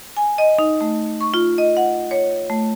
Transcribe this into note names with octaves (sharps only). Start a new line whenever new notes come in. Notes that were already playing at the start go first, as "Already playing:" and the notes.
G#5
D#5
D#4
A3
C#6
F4
D#5
F#5
C#5
A3